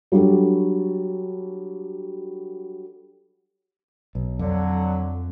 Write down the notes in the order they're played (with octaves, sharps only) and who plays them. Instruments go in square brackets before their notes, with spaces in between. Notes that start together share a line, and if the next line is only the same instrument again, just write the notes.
[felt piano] F#3 G3 D4 F#4 A4
[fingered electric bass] B1
[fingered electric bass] F2 [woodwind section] D3 F#3